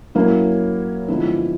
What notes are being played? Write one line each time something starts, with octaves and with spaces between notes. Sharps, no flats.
F#3 A#3 C#4 E4
D3 F3 G#3 B3 E4